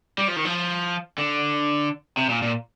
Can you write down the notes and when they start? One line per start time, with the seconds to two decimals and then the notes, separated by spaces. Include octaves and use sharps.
0.18 G3
0.28 F3
0.36 D#3
0.45 F3
1.18 D3
2.17 C3
2.29 A#2
2.42 A#2